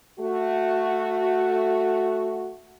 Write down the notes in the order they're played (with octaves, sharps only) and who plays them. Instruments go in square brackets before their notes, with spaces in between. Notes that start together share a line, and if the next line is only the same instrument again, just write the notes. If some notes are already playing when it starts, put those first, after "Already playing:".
[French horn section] A3 F#4